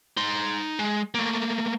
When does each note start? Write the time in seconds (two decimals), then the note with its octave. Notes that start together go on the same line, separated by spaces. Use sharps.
0.17 D#4 C6
0.79 G#3
1.14 A3 A#3